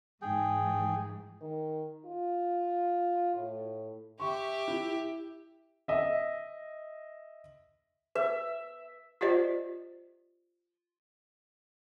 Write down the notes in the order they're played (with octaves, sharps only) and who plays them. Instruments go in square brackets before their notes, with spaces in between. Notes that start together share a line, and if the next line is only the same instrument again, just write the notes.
[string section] G#2 E3 [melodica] G#4 G5
[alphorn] D#3
F4
A2
[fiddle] G4 E5 [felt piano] C#6
[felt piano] E4
[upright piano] D#5 E5
[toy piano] B4 [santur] E5
[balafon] F4 G4 C5 D5 D#5